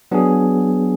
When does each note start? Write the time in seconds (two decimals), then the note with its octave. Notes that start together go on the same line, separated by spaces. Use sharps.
0.11 F#3 B3 D4 G#4